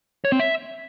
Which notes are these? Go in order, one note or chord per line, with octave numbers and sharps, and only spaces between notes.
C#5
C4
E5